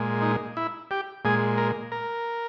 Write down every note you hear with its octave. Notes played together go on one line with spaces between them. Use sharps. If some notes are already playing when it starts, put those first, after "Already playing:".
Already playing: A#2 G#3
D#4
E4
G4
A#2 G#3 G#4
A#4
A#4